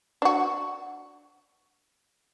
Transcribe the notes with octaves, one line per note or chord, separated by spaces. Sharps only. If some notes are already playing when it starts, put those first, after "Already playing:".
D4 F#4